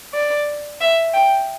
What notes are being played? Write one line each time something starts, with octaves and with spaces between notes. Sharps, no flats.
D5
E5
G5